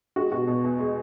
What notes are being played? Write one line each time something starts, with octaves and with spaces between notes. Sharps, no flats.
G#3 F#4
B2 F#4
B2
E2
G#3